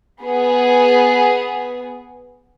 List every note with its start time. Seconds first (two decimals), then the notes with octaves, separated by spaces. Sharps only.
0.22 B3 G#4